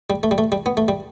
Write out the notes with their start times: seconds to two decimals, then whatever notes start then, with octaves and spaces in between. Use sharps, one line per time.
0.10 G3
0.23 A3
0.31 G3
0.38 A3
0.52 G3
0.66 B3
0.77 A3
0.88 G3